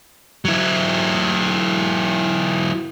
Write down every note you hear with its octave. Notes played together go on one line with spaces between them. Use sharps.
F#3 E4